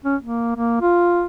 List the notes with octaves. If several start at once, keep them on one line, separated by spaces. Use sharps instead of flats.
C#4
A#3
A#3
F4